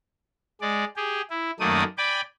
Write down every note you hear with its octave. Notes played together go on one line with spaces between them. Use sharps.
G#3 D5
G4 G#4
E4
F#2 D#3 A3 A#3 D5 D#6
D5 G5 G#5 B5 D6